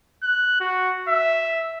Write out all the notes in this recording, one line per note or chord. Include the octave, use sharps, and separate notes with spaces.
F#6
F#4
E5